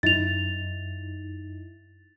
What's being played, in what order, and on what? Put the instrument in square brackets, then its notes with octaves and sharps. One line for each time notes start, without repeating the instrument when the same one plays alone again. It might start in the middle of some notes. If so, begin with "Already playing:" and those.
[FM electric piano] F#2 D#4 E4 [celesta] A6 F7